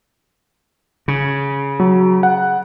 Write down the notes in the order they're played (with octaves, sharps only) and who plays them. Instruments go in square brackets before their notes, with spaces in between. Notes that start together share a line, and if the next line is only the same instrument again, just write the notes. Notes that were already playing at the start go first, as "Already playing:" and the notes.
[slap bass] C#3
[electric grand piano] F#3
F#5